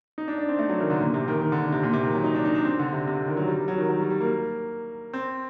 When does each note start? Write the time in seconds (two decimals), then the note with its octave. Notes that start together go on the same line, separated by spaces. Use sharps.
0.18 D#4
0.28 D4
0.38 D4
0.49 C4
0.59 A3
0.69 F#3
0.80 D#3
0.90 D3
1.00 A#2
1.14 C3
1.28 D#3
1.41 D#3
1.52 D3
1.72 C3
1.83 A#2
1.93 C3
2.03 D#3
2.14 F#3
2.24 D#4
2.35 D4
2.45 D#4
2.55 D4
2.65 C4
2.79 D3
2.92 C3
3.07 C3
3.17 D3
3.28 D#3
3.37 F#3
3.47 G3
3.58 G3
3.68 F#3
3.78 D#3
3.89 F#3
4.00 G3
4.10 G3
4.20 A#3
5.13 C4